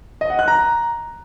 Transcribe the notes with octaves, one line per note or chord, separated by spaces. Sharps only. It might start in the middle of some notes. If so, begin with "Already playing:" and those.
D#5
F#5
F#6
A#5